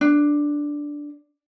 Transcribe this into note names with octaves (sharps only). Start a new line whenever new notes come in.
D4